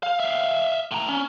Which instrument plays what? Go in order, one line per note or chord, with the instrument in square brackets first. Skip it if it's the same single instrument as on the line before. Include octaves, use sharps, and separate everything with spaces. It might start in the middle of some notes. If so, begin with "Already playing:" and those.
[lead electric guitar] F5
E5 F5
A2 A#5
C#4